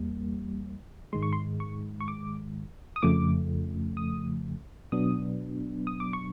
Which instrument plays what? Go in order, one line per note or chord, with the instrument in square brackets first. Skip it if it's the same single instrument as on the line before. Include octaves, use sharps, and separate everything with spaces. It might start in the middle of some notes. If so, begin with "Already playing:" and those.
Already playing: [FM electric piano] E2 G3 A#3
G#2 D#3 G#3 C6
C#6
C6
C#6
C#6
D6
D#6
F2 C#3 F3 A3 D6
D#6
B2 F#3 B3 D4 D#6
D#6
D6
C#6